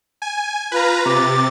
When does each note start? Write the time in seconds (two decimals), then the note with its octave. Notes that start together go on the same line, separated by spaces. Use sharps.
0.22 G#5
0.72 F4 B4 A#5
1.06 C3 D6 A6